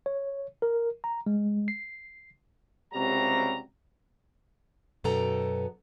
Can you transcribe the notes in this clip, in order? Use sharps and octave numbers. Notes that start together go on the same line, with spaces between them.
C#5
A#4
A#5
G#3
C7
C#2 C3 F#3 G3 A#5
F#2 B2 B3 A4 G5 A#5